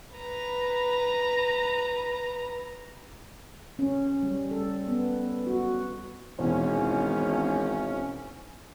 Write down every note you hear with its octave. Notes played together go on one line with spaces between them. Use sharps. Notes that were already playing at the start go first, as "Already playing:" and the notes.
B4 A#5
C#4
G3
A4
B3
F#4
G#1 E2 B2 C#4 C5